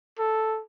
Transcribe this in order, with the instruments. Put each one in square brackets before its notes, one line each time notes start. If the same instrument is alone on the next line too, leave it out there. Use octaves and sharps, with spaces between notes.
[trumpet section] A4